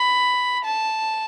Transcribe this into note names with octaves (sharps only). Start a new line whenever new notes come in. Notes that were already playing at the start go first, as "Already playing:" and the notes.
Already playing: B5
A5